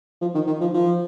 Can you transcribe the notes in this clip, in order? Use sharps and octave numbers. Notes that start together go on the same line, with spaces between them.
F3
D#3
D#3
F3
F3